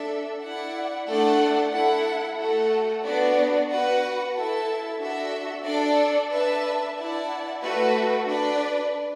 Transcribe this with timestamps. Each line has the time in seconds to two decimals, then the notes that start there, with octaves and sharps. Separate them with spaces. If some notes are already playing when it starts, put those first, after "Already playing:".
Already playing: D4 A4 E5
0.42 E4 D5 F#5
1.07 A3 D4 A4 D5 F#5
1.72 E4 A4 F#5
2.38 A3 F#4 A4 F#5
3.03 B3 D4 F#4 B4 D5
3.69 F#4 B4 F#5
4.34 E4 A4 E5 A5
5.00 D4 F#4 A4 E5
5.65 D4 A4 D5
6.30 D4 B4 E5 A5
6.96 E4 D5 F#5 A5
7.62 A3 F#4 B4
8.27 D4 B4 D5